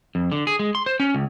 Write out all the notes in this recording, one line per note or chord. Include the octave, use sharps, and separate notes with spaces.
F2
D3
G#4
G#3
C6
C5
C#4
C#2